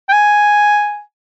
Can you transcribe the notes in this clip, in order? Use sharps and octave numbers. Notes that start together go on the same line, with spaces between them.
G5
G#5